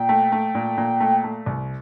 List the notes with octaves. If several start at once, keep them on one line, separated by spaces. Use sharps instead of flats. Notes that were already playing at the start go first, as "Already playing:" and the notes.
Already playing: A#2 G5
A3
A3
A#2
A#2
A3
A3
C2